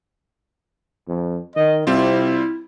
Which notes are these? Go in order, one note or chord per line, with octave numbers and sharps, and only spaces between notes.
F2
D#3 D#5
C3 G3 C4 E4 F4